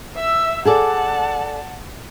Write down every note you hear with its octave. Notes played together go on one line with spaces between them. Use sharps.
E5 E6
G#4 A4 D5 F#5 A5